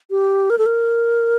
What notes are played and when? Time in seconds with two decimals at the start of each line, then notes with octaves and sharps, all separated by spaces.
0.11 G4
0.50 A#4
0.58 A4
0.66 A#4